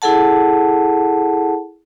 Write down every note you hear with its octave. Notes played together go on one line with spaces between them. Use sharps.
E4 G#4 A4 F#5 A5